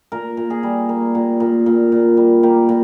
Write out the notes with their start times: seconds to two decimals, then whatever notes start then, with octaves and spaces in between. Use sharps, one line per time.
0.12 A#2 A#4
0.37 A#2
0.50 G#4
0.63 G3
0.89 A#3
1.15 A#2
1.40 A#2
1.66 A#2
1.92 A#2
2.17 G3
2.43 A#3 G4
2.69 A#2